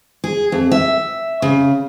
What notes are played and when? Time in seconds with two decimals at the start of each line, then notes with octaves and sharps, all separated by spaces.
0.24 G#4
0.52 F2
0.72 E5
1.42 C#3